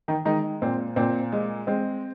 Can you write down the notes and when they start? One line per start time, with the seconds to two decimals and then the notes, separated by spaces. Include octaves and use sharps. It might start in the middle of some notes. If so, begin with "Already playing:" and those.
0.08 D#3 D#4
0.25 D#3 G#3 D#4
0.62 A#2 C4
0.96 A#2 C4
1.32 G#3
1.67 G#3 C4